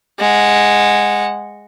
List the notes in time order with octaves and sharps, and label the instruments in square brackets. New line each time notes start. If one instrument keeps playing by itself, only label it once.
[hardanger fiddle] G#3 F#5